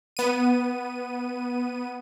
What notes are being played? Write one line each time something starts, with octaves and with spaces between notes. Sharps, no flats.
B3 D#7